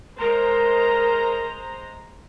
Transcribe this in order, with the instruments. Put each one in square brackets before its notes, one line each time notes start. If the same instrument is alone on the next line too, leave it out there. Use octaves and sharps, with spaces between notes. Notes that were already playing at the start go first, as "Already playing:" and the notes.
[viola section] G#3 C5 A#5 [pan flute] A#4